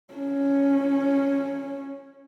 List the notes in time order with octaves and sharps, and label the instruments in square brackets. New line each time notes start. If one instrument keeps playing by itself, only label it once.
[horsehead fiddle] C#4